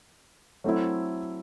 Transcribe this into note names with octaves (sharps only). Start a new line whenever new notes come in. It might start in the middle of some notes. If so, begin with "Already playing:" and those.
F#3 A3 C4 E4